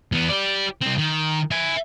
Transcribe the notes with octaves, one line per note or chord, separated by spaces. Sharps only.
E2 B3
G4 D5
C2 C4
D#3
E5 G#5